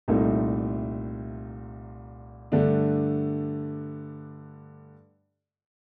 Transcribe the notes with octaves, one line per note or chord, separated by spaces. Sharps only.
C2 A#2 A3 C4 D#4
G2 D3 A3 D4